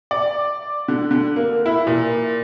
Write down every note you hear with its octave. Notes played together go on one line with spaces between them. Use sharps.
D5
D3
D3
A#3
E4
A#2